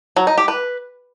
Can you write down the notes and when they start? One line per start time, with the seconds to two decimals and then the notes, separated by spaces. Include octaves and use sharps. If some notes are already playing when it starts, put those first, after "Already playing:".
0.17 F#3
0.27 D#4
0.38 G4
0.48 B4